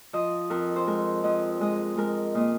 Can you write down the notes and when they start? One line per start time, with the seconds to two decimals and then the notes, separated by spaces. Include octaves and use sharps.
0.13 F3 D#5
0.50 F2 A#4
0.76 C5
0.87 G#3 A#4
1.24 F2 D#5
1.61 G#3 D#5
1.97 G#3 A#4
2.35 A#2 D#5